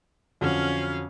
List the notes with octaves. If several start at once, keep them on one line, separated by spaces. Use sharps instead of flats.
F2 D3 F#3 C#4 F5